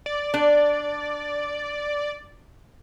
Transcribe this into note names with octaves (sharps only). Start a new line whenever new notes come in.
D5
D4